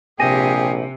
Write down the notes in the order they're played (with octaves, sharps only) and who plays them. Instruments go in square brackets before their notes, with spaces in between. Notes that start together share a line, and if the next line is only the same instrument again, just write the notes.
[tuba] A#1 [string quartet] C3 [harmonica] G4 G#4 [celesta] G#5 A#6 D#7